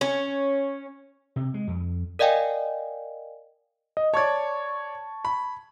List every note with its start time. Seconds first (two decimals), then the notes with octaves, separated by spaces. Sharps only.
0.01 C#4
1.36 C3
1.54 G#3
1.67 F2
2.19 A#4 D5 D#5 F5 G5 G#5
3.97 D#5
4.14 C#5 D5 A5 C#6 G#6
5.25 B5